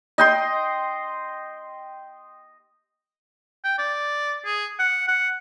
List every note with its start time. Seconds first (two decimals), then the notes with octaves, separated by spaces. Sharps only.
0.18 D#5 G5 C6
3.64 G5
3.78 D5
4.45 G#4
4.79 F#5
5.08 F#5